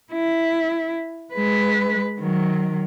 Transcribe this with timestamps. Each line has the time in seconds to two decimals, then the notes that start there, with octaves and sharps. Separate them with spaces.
0.12 E4
1.33 G#3 B4
2.20 D#3 F#3